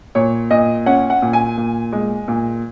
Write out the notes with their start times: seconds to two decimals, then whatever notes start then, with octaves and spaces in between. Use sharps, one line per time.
0.15 A#2 C#5
0.51 A#2 D#5
0.86 C#4 F#5
1.10 F#5
1.22 A#2
1.33 G#5
1.57 A#2
1.93 G#3
2.28 A#2